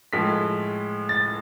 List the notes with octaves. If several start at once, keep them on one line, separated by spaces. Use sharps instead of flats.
A2 F3 G#3 B6
A6